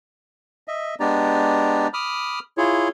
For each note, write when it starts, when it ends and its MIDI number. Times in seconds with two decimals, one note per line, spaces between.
0.68 0.95 75
0.68 0.95 76
1.00 1.88 56
1.00 1.88 59
1.00 1.88 62
1.00 1.88 67
1.00 1.88 74
1.00 1.88 82
1.93 2.39 83
1.93 2.39 86
1.93 2.39 87
1.93 2.39 89
2.57 2.89 64
2.57 2.89 65
2.57 2.89 68
2.57 2.89 73